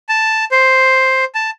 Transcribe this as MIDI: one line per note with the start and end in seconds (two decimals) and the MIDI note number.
0.09 0.45 81
0.51 1.24 72
1.35 1.50 81